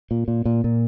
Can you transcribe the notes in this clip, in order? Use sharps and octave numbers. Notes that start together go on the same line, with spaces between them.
A#2
A#2
A#2
A#2